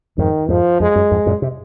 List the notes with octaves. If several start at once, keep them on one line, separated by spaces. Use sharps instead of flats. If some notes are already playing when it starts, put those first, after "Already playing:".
F2 G#2 D#3
F2 G#2 F3
F2 G#3
F#2
F2 G#2
F#2 A#2
C3